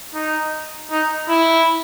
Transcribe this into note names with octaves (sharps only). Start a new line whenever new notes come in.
D#4
D#4
E4